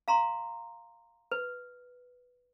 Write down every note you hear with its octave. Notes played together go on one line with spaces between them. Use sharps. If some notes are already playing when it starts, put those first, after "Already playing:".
F5 A#5 C6
B4